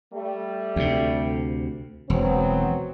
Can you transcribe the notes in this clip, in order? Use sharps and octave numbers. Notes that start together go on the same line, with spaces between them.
G3 A3
D2 C3
E1 F#3 B3 C4